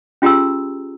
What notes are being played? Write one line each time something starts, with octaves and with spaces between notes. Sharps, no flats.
C#4 F4 G4 G#4 A#5 E6